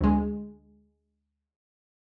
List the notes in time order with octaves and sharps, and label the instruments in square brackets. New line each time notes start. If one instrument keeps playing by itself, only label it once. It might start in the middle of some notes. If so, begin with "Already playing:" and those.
[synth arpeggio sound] D2 G#3